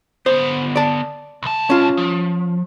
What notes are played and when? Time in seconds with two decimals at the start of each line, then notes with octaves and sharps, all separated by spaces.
0.26 D3 B3 C5
0.76 D5 A5
1.43 C2 A5
1.70 C#4 F4
1.97 F3